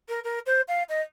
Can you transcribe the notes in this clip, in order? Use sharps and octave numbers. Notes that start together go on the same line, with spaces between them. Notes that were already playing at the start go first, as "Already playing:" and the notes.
A#4
A#4
C5
F5
D#5